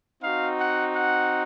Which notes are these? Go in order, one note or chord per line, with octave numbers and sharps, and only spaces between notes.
C4 D#4 F#4 F5
F#5
F#5